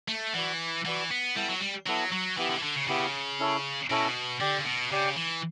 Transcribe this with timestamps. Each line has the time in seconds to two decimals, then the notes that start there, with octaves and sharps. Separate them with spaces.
0.08 A3
0.34 E3 F#4 B4 D5 F#5
0.85 E3 F#4 B4 D5 F#5
1.11 B3
1.36 G3 B3 E4 A4
1.49 F#3
1.61 G3
1.87 F#3 B3 E4 A4
2.12 F#3
2.37 E3 B3 E4 G4
2.50 D3
2.58 E3
2.63 D3
2.76 C#3
2.88 C#3 B3 E4 G4
3.39 C#4 E4 A4 C#5
3.90 B2 C#4 E4 A4 C#5
4.40 D3 G4 D5 G5
4.58 C#3
4.66 B2
4.91 C#3 G4 D5 G5
5.16 E3